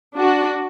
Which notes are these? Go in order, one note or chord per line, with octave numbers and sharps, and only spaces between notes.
D4 F#4